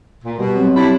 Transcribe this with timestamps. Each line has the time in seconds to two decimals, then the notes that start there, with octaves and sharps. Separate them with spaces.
0.24 A#2
0.38 B2 G3 G4
0.55 F#3 C4 C#5
0.75 G3 D4 E4